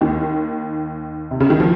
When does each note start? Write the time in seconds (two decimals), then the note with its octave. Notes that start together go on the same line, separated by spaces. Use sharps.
0.01 D#2 D#3
1.31 C3
1.40 C#3
1.50 D#3
1.60 F3